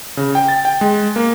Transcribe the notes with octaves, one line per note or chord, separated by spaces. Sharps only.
C#3
G5
A6
G5
G#3
A#3